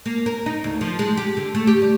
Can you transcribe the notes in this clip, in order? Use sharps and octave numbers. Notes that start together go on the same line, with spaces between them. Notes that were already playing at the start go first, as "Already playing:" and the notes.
A#3
A#4
D#4
D2
F3
G#3
G4
D3
A3
G4
G3